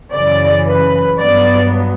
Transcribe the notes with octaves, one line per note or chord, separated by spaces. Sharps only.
F#2 C#3 E3 D5
B4
G2 F#3 B3 D5